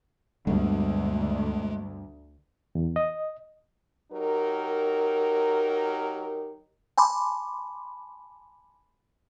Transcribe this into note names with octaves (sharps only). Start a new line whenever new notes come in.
D2 G2 B2 D3 G#3 A3
E2
D#5
F#3 D#4 G4 A#4
G#5 A5 B5 C6 D6